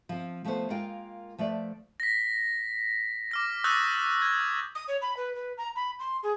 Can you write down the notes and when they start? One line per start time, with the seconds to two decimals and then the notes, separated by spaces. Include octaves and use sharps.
0.09 F3 C4
0.45 F3 A3 B3 F4 C5
0.70 G#3 A#3 F4 A#4 F5 G5
1.38 F3 A3 B4 D5
2.00 A#6 B6
3.31 D6 F6 A#6
3.64 C#6 D#6 E6 F#6 G6 A6
4.22 G#6
4.75 D#6
4.88 C#5
5.02 B5
5.17 B4
5.35 B4
5.58 A#5
5.76 B5
6.00 C6
6.23 G#4